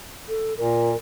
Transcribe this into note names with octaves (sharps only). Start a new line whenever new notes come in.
A4
A#2 A#4